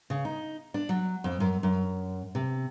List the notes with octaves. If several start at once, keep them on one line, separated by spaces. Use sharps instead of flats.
C#3
D#4
D4
F#3
F2
F#2
F#2
C3